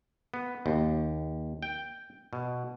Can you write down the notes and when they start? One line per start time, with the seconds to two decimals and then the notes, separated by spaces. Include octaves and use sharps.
0.34 B3
0.66 D#2
1.63 G5
2.33 B2